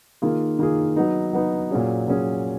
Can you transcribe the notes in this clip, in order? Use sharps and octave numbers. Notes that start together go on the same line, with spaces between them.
D#3 A#3 F4 G#4
D#3 A#3 F4 G#4
F#3 B3 D#4
F#3 B3 D#4
A#2 F#3 C#4 G#4
A#2 F#3 C#4 G#4